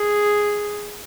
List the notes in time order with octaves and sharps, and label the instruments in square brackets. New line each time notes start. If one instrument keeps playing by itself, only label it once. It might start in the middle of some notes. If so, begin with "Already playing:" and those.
Already playing: [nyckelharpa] G#4